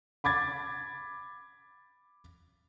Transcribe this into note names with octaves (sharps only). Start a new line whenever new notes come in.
B5 D6 G#6 A6